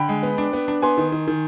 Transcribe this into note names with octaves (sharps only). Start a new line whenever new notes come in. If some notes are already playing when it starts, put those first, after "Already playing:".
Already playing: D3 G5 B5
G#3
B3
D4
B3
D4
B3 G#5 C6
D#3
D#3
D#3